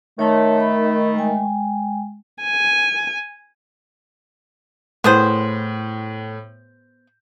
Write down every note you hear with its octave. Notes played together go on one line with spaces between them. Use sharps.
D#3 A3 C#5 A5 C6
B5
G#3 G5 G#5
G#5
A2 B3 G#4 C5